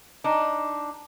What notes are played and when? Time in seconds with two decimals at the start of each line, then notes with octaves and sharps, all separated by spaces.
0.24 D4 D#4